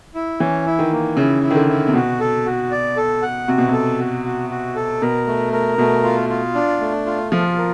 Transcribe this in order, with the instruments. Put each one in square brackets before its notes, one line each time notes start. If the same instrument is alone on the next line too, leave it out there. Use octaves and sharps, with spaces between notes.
[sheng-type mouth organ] E4
[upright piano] E3 [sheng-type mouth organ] C#4
[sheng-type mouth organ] E4
[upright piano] D#3
[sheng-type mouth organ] A#3
[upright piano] C#3 [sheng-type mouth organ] E4
[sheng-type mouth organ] E4
[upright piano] D#3
D3
[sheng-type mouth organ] E4
[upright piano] C3
[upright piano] B2 [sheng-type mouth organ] F#4
[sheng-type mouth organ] A4
F#4
D5
A4
F#5
[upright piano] C3 [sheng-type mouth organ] F#4
[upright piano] B2
[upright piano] C3 [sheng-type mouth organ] A4
[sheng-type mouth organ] F#4
F#4
F#4
A4
[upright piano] B2 [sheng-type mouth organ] A#4
[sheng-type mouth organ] A3
A#4
[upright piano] B2 [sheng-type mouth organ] A3
[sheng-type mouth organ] F4
F4
D4
A3
F4
[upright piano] F3 [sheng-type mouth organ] F4
[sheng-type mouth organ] A#4